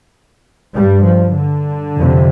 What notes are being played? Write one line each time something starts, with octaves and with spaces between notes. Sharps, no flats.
G2 G3
F3
D3
F2 C3